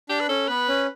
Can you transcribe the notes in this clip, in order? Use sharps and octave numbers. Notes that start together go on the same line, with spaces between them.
D4 G4
B4
C#4 A4
B3 B4
C#4